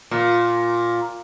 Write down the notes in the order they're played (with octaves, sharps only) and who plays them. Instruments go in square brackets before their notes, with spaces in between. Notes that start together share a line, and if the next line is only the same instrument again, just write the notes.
[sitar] A#2